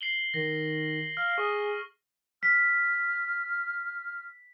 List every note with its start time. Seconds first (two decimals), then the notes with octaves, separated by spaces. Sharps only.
0.01 C7 F#7 G7
0.34 D#3 A#6
1.17 F5 F6
1.38 G#4 C#6
2.43 F6 B6